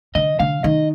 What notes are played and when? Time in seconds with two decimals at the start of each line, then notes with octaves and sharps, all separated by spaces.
0.15 D3 D#5
0.39 D3 F5
0.63 D#3 D#5